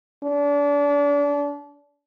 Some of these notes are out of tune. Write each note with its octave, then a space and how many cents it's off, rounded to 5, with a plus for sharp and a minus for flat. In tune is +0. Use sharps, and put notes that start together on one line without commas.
D4 -30